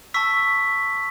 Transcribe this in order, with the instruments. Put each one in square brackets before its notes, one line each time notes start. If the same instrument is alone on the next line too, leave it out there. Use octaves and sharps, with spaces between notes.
[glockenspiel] A5 C#6 E6 B6